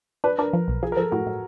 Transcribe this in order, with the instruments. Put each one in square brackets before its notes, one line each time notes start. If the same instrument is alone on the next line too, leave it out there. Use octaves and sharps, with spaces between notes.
[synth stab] D4 [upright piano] B4
[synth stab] D4 [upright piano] A#4
[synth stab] F3
B1
[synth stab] F3 [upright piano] G#4
[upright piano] A#4
[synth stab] F3 [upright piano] A4
[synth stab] A2 [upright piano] F#4
[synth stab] A2